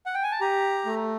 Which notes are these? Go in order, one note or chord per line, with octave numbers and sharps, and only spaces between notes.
F#5
G5
G#5
A5
G4 A#5
A3